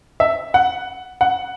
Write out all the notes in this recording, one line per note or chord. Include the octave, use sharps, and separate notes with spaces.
E5
F#5
F#5